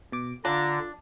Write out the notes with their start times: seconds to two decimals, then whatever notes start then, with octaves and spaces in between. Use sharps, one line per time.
0.12 B2 D6
0.45 D3 D4 F4 A#5